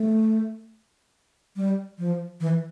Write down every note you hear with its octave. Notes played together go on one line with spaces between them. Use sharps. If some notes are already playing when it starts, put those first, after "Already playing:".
Already playing: A3
G3
F3
E3